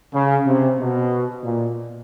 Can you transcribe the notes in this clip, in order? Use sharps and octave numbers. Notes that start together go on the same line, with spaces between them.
C#3
C3
B2
A#2